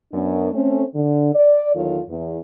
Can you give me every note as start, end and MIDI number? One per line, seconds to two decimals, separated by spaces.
0.13 0.53 42
0.13 0.53 59
0.13 0.53 62
0.53 0.83 57
0.53 0.83 60
0.53 0.83 61
0.95 1.30 50
1.34 1.72 74
1.75 1.99 40
1.75 1.99 51
1.75 1.99 54
1.75 1.99 65
1.75 1.99 69
1.75 1.99 73
2.09 2.38 40